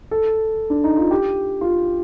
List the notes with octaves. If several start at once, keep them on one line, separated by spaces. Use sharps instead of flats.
A4
D4
D#4
F4
G4
F4